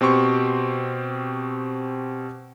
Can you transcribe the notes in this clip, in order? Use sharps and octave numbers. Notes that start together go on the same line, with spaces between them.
B2 C4 G4 C6 C#6